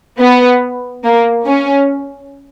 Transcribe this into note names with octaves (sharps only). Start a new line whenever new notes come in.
B3
A#3
C#4